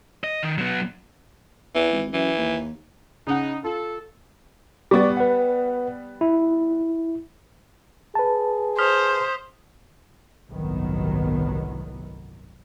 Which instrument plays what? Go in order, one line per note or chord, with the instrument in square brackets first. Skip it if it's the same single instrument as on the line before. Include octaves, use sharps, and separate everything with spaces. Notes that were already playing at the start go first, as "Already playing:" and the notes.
[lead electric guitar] D#5
D#3
F#3 B3
[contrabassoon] E2 [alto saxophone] E3
[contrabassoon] G#1
[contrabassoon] F#2 [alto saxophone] E3
[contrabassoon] D#2
[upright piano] C#3 F#5 [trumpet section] D#4
[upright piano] F4 [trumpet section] A4
[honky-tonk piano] G3 B3 [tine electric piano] D5 C#6 D6
[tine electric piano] B4 F#5
E4
[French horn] G#4 [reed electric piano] B4 A5
[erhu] C5 [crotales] D#6 F6 B6
[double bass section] G1 C2 A2 D#3 F#3 B3